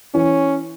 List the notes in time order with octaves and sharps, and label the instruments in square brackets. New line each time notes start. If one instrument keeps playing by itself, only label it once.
[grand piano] E3 [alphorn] C#4